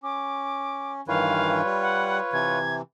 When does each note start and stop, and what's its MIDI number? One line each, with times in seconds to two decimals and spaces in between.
0.03 1.01 61
0.03 0.93 86
1.08 1.62 43
1.08 1.62 51
1.08 1.62 52
1.08 2.58 65
1.08 2.58 71
1.08 2.58 73
1.08 1.58 77
1.65 2.20 55
1.82 2.17 78
2.33 2.82 48
2.33 2.82 52
2.33 2.76 92